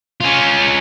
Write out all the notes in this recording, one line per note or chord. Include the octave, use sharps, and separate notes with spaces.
C#4 F4